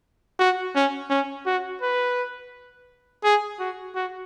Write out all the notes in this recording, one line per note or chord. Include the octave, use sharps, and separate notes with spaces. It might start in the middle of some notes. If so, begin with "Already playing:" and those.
F#4
C#4
C#4
F#4
B4
G#4
F#4
F#4